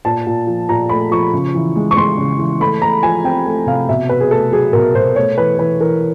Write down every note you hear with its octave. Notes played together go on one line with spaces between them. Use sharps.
A#2 A5
A#2
F3
A#2 A#5
A3 B5
F3 C#6
C#3
E3
G#3
C#6
G#3 C6
C#3
E3
A3 B5
A3 A#5
F3 G#5
C4 G5
A3
C3 F5
B2 E5
B2 B4
G#4
A3 A4
F#3 G#4
B2 A#4
B2 C5
A3 C#5
E3 B4
E3 B4
E3 A#4